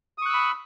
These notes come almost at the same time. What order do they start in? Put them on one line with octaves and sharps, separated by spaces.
D#6 C#6 F#6 E6 B5